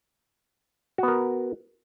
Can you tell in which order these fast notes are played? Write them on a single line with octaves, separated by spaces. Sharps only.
F#4 B3 A#4